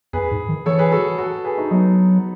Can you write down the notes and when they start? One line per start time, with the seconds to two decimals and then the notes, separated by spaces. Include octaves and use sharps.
0.13 E2 G#4 B4
0.31 G#2
0.48 D#3
0.66 E3 A4 C#5
0.79 G#4 B4
0.92 F#4 A4
1.18 F#4 A4
1.44 G#4 B4
1.58 D#4 F#4
1.71 F#3 B3 D#4